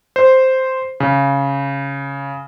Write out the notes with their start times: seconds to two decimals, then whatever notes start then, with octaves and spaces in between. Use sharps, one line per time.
0.16 C5
1.00 C#3